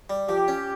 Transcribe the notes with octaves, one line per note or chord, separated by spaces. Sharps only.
G3
F3 G4
C#4